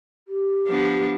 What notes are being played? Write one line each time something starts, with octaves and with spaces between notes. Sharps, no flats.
G4
F3 B3 D4